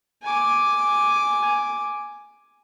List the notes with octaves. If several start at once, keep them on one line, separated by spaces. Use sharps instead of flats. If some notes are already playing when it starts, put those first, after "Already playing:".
G#5 D6